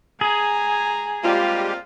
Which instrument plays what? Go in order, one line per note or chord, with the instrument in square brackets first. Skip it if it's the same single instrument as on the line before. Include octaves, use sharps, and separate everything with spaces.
[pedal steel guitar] G#4 [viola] G#5 A#5
[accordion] G3 G#3 G4 [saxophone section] A#3 C4 F4